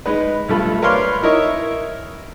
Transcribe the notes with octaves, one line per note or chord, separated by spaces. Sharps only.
G#3 D#4 B4
B1 G2 A3 F4 A4 B5
A#4 B4 C#5 D5 F5 C6
D#4 E4 A#4 C#5 D#5 E5